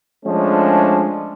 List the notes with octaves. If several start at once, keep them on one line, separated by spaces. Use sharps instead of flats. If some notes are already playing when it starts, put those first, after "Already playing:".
F3 G#3 A3 C#4 D4